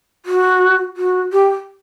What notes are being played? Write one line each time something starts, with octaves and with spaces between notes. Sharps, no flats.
F#4
F#4
G4